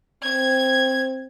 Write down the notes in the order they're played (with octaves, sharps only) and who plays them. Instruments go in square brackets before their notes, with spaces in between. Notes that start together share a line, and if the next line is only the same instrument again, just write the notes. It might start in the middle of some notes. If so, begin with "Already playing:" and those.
[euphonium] C4 [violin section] G#6